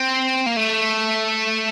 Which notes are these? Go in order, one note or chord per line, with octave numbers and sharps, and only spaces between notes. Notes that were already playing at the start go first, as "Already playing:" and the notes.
Already playing: C4
A#3
A3